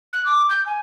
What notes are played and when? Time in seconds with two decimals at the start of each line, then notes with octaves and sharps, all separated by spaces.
0.12 F#6
0.25 D6
0.49 G6
0.66 G#5